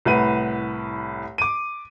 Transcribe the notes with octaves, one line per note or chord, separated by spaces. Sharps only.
C2 A2 B4 F#5 B5 D#7
D6 D#7